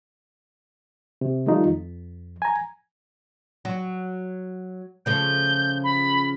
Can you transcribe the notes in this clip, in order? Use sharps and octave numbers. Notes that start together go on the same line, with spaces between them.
C3
D#3 F3 G3 A3 D#4 F4
F2
G#5 A#5
F#3
C#3 F3 A3 G6
B5